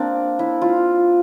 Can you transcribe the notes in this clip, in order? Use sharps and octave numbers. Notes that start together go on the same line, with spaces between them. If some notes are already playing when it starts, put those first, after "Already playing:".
Already playing: A#3 C4 D4
E4
F4